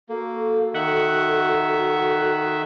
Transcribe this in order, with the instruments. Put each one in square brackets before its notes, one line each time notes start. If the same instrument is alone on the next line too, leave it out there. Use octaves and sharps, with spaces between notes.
[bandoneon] A#3 [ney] F#4 [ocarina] A4
[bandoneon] D#3 E5 [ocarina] A4 [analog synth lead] F#5